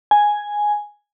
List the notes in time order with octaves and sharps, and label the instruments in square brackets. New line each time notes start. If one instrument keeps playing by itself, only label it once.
[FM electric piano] G#5